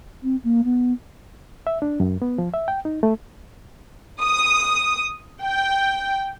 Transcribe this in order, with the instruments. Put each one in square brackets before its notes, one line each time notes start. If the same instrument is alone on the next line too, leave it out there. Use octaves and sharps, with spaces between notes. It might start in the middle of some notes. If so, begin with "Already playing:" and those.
[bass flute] C4
A#3
B3
[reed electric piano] E5
D4
F#2
B3
F3
E5
G5
D#4
A3
[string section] D#6
G5